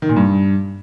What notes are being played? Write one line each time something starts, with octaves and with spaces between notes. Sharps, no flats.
D#3
A#2
G2